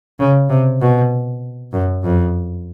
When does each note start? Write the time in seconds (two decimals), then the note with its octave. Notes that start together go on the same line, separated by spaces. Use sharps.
0.19 C#3
0.50 C3
0.81 B2
1.73 F#2
2.04 F2